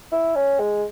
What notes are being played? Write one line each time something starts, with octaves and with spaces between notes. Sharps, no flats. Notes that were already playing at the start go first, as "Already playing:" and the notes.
E4
C#4
G#3